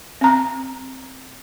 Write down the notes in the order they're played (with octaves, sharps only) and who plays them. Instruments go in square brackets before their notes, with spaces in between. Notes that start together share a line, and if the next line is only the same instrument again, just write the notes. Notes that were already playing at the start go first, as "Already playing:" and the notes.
[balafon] C4 A#5